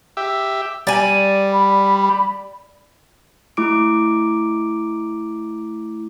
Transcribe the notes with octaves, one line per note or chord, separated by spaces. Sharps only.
G4 E5
G3 D5 G#5
B5
A3 E4 D6 D7